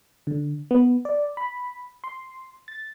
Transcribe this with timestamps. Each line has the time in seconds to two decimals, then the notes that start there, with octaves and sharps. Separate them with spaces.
0.27 D3
0.71 B3
1.05 D5
1.37 B5
2.04 C6
2.68 A6